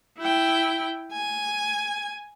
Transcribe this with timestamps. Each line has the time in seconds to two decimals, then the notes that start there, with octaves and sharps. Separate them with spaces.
0.19 E4 G5
1.12 G#5